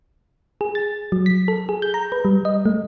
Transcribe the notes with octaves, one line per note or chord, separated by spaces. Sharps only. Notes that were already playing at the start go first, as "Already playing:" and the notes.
G#4
A6
F#3
B6
A4
G#4
G6
A#5
B4
G3
D#5
A3